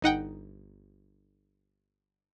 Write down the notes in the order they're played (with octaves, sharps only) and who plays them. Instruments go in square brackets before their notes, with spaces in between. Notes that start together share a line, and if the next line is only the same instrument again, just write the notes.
[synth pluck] G1 D#4 F#5 G5